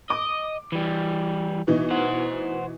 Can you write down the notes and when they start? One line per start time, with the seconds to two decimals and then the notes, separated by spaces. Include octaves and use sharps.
0.10 D#5 D6
0.72 E3 G3
1.67 B2 E3 D#4
1.91 C5 F#5